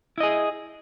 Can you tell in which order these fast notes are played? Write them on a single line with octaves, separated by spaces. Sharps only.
E4 D#5 G#4